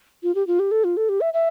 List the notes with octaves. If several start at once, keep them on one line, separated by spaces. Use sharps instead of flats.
F4
G4
F4
G4
A4
F4
A4
G4
E5
E5